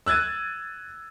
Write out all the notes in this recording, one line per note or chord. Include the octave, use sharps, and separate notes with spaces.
E6 F#6 G#6 A6 D#7